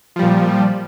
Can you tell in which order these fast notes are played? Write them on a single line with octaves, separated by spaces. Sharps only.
F3 G3 A#2